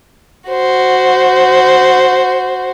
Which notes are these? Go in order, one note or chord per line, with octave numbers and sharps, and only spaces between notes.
F#4 C5